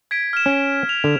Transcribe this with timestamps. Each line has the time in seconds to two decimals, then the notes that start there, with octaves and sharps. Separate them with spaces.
0.11 G#6 B6 D7
0.33 F6 E7
0.46 C#4
0.89 F7
1.04 D3